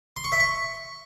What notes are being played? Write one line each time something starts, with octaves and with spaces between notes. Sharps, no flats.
C6
C#6
E5
C#6